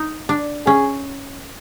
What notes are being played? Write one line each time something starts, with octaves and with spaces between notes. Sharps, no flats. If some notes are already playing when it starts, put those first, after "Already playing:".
Already playing: D#4
D4
C#4 G#4